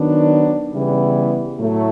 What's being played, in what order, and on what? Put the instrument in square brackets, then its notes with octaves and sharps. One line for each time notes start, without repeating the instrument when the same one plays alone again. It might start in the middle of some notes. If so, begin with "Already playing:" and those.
Already playing: [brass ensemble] D#3 F#3 B3 D4
C#3 E3 G3 B3 E4
A2 F#3 A3